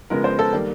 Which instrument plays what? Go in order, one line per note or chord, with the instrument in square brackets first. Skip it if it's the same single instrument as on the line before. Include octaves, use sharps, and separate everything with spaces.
[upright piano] C#3 F3 G#3 B3 A#4
C5
A4
D#3 G3 A#3